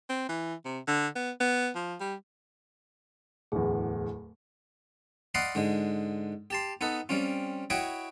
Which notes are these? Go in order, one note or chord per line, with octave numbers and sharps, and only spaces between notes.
C4
E3
C3
D3
B3
B3
F3
G3
D1 E2 G#4
D5 D#5 F5 F#5 B5 C6
G#2 D3 G#3
G4 A5 C6
B3 D#4 A4 B4
G3 C4 C#4 F4
E4 F#4 C#5 D#5 G5 B5